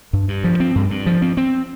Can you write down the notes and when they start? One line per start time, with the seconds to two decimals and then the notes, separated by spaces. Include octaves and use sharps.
0.13 G2
0.28 G2
0.44 F3
0.60 C4
0.75 G2
0.91 G2
1.06 F3
1.22 C4
1.37 C4